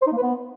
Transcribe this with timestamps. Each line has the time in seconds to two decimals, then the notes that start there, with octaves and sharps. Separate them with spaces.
0.02 C5
0.07 D#4
0.12 A#3
0.17 B4
0.22 B3